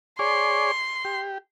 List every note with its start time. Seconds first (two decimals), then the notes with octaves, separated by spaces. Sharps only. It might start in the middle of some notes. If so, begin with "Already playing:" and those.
0.19 G#4 C#5 D5 C6
1.05 G4